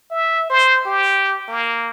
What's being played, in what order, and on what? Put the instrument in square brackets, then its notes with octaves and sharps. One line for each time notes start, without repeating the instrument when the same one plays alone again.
[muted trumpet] E5
C5
G4
A#3